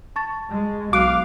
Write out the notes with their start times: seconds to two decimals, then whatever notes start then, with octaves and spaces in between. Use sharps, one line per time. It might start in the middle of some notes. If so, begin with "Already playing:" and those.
0.16 A5 C#6 A6
0.50 G#3
0.93 B1 F#4 F5 D6 F#6